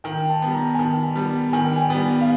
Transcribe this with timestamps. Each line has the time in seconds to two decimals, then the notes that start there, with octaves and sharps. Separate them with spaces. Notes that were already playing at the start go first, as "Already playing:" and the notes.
0.04 D#3 G5
0.29 A5
0.42 G3 B3
0.54 A#5
0.74 G#5
0.79 D#3 A5
1.15 G3 B3
1.53 D#3 G#5
1.65 G5
1.76 G#5
1.90 G3 B3
2.21 F5